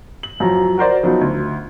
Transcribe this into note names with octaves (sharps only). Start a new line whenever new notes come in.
F#7
F#2 F3 F#3 A#5
F#4 A#4 C5 D5
F3 F#3 B3 D#4
D2